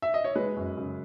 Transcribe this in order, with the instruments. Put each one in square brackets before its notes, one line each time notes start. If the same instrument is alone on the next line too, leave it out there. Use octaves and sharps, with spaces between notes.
[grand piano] E5
D#5
C#5
G#3 B4
F#2
C#3